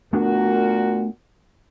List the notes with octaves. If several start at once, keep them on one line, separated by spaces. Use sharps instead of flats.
A#2 A3 B3 D4 F#4 A#4